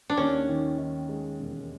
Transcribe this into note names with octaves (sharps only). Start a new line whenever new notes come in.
D4
D#2 C#4
D#3
D#3
G#3
E1